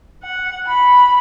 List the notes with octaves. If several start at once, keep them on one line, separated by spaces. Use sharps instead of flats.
F#5
B5